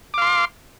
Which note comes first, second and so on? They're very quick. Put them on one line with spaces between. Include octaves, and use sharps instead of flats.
D6 F5 C6